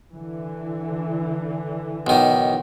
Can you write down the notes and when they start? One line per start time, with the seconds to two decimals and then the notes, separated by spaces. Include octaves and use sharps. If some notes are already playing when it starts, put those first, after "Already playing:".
0.13 D3 E3
2.07 B1 D#3